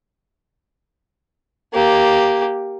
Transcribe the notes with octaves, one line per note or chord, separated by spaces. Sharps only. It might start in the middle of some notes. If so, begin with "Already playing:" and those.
A#3 G4